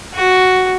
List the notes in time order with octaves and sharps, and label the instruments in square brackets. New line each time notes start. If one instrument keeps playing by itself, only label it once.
[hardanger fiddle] F#4